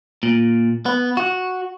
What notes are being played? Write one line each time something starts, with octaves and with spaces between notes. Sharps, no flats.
A#2
B3
F#4